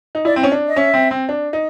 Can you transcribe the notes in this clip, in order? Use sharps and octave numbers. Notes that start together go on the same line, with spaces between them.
D#4
E4 D5
C4
C#4
D4
D#5
C#4 E5
C4
C4
D4
D#4